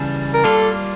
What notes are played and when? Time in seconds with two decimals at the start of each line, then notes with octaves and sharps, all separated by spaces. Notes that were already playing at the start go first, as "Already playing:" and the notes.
Already playing: C#3 E3 G3 D4
0.34 A#4
0.44 G3 A#3 D4 F4 A4